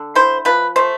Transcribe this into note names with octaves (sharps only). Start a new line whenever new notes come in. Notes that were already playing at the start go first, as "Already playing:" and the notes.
Already playing: D3
E4 C5
F3 B4
A3 C5